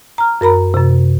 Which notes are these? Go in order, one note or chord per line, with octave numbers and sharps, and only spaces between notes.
A#5 F6
F#2 A#4 A#5 B5
F#2 C3